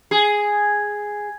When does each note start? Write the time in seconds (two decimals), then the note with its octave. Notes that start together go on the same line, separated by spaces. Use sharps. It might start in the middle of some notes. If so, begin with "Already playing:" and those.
0.11 G#4